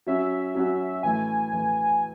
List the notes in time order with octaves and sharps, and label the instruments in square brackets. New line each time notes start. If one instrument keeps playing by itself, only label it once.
[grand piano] F#3 C#4 F#4 [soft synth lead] E5
[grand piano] F#3 C#4 F#4
[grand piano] A2 E3 A3 [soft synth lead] G#5
[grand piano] A2 E3 A3